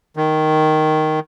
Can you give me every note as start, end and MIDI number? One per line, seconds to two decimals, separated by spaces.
0.17 1.20 51